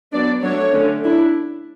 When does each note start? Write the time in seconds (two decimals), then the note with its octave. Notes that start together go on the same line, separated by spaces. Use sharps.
0.12 F#3 B3 D4 D5
0.43 F#3 A3 D4 C#5
0.73 D3 A3 C#4
1.05 D4 E4